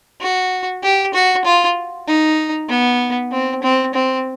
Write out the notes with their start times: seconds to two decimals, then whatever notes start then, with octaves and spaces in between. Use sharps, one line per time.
0.21 F#4
0.83 G4
1.14 F#4
1.45 F4
2.08 D#4
2.69 B3
3.32 C4
3.63 C4
3.94 C4